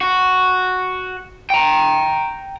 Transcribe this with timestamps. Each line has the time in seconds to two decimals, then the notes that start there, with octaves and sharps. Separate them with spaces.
0.01 F#4
1.50 G5 A#5